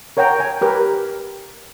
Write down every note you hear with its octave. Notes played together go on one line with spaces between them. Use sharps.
A#4 C#5 F#5 G5 A#5
G#5
G4 A#4 B4